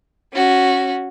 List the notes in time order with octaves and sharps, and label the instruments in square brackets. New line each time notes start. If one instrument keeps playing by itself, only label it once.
[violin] C#4 F#4